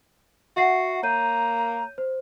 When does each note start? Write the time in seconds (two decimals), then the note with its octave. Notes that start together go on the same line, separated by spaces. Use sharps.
0.57 F#4 E5 F#5 C7
1.03 A#3 C#5 A#5 G6 D#7
1.98 C5